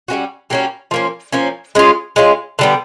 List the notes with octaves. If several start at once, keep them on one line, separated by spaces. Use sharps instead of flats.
G3 A#3 C#4 F#4
G3 A#3 C#4 F#4
F3 A#3 C#4
F3 A#3 C#4
G#3 C#4 F4
G#3 C#4 F4
D3 G3 B3